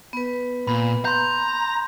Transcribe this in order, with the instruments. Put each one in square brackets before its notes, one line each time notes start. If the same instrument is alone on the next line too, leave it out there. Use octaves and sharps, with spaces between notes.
[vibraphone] B3 B4
[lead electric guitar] A#2 [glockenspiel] B5
[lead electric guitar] A#5 [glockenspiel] C6 G6